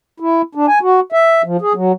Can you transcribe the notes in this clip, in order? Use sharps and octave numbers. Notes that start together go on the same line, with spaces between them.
E4
D4
G#5
F#4
E5
F3
G#4
F#3